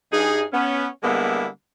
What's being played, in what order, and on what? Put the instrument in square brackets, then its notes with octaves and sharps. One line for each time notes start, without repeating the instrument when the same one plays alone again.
[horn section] G2 D#4 G#4
B3 C#4
D3 G3 G#3 A#3 B3 E4